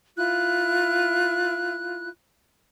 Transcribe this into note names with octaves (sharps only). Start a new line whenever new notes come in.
E4 F4 F#6